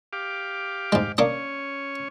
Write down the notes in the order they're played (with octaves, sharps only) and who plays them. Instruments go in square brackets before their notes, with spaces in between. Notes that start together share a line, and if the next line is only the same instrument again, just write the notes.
[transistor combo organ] G4 F5 D6
[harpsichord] G#2 G#3
[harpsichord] A#3 D4 D#5 [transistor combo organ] C#4 C#5